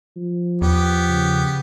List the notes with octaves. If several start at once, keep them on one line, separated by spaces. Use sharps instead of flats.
F3
E2 B3 G4
C#3